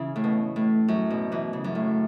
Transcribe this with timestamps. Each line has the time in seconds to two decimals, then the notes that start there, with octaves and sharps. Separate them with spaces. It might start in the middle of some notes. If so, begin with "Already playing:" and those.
Already playing: C#3 E3
0.16 A2
0.24 B2
0.56 A2
0.88 F#2
1.10 B2
1.32 B2 E3
1.53 C#3
1.64 F#2
1.75 A2